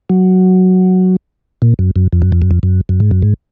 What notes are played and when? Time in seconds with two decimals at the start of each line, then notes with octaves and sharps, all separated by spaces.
0.10 F#3
1.62 A#2
1.79 F#2
1.96 F#2
2.13 F2
2.22 F#2
2.32 F2
2.42 F#2
2.51 F2
2.63 F#2
2.89 F#2
3.00 G#2
3.11 F#2
3.22 G#2